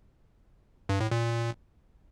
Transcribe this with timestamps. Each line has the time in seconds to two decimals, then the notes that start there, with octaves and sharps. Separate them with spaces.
0.89 G2
1.00 A2
1.11 A#2